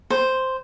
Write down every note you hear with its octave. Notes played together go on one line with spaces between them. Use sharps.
C5